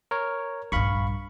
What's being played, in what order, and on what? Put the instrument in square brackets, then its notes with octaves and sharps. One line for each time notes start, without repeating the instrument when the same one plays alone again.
[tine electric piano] A#4 C#5
[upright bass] A#1 G2 [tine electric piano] F5 B5 C#6